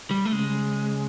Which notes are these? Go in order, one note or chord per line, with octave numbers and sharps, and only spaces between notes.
G3
A3
C#3 G#3